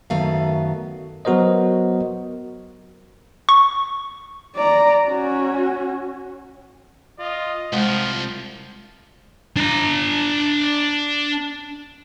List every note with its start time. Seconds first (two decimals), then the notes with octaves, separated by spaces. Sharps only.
0.10 F#2 D#3 A3 B3 F#4 F5
1.25 F#3 B3 F#4 A#4 C5 D#5
3.49 C#6
4.56 D5 A#5
5.07 C#4 F#4
7.20 F4 D#5
7.73 C2 F3 G#3 F4
9.56 D4 A#5